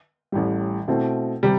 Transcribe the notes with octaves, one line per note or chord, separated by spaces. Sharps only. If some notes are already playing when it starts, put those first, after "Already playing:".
A1 A2 G3
B2 A3 C4 E4
C3 G3